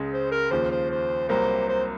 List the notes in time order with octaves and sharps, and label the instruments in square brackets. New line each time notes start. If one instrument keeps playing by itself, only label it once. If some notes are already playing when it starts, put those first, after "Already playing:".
Already playing: [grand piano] C#2 C#3 G#3
[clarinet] C5
A#4
[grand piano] D#2 C#3 F3 [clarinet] C5
[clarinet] C5
C5
[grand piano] C2 C3 F#3 A#3 [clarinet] C5
[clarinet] C5